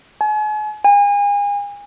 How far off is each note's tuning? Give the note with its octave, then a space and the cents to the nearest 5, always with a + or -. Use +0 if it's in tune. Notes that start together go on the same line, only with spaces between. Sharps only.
G#5 +40
G#5 -35